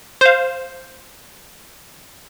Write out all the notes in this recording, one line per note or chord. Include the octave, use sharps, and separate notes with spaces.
C5 F5